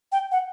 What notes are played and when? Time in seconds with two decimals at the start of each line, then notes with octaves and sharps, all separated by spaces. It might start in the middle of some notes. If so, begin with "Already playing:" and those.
0.12 G5
0.32 F#5